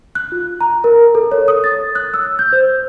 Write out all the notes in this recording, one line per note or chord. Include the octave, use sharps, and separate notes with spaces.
F#6
F4
A#5
A#4
A4
C#5
D#6
A6
F#6
E6
G6
C5